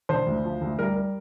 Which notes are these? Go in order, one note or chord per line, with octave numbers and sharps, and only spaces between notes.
D3 C5
D2
F3
D2
G3 A#4
A#4